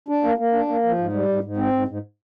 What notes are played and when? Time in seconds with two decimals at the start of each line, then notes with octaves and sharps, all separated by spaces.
0.08 D4
0.24 A#3
0.38 A#3
0.53 D4
0.68 A#3
0.83 F3
0.98 G#2
1.13 G3
1.28 G#2
1.43 G#2
1.57 C4
1.72 G#2
1.88 G#2